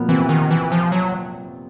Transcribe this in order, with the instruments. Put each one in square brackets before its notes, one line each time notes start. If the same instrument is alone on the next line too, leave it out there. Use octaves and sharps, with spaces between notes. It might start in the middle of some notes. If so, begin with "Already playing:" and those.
Already playing: [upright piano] A#2 F3 A#3 B3
[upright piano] C3 C4 [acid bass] E3
[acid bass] D#3
E3
F3
F#3